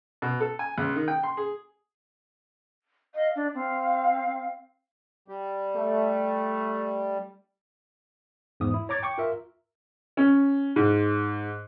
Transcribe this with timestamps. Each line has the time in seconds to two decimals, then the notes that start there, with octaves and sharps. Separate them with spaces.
0.22 B2
0.40 A4
0.59 G#5
0.78 C#2
0.96 D#3
1.08 G5
1.24 C6
1.37 G#4
3.15 D#5 F5
3.35 D4 D5
3.54 C4 F5
5.28 G3
5.76 A3
8.60 E2 G#2 D#6
8.74 E4
8.89 C#5 A#5 D6 G#6 A6
9.03 G5 C#6 D6
9.18 F4 A#4 E5
10.17 C#4
10.76 G#2